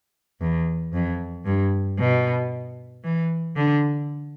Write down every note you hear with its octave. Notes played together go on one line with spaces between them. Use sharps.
E2
F2
G2
B2
E3
D3